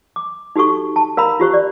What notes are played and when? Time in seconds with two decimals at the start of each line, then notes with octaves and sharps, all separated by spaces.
0.16 D6
0.56 D#4 F#4 G4 A4 C#6
0.96 A5
1.17 A#4 F5 A#5 B5
1.40 F4 G4 C5 C#6
1.53 D5